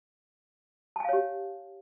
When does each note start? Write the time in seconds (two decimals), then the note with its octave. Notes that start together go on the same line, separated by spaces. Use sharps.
0.96 A5
1.00 G#5
1.04 F5
1.09 C#5
1.13 G4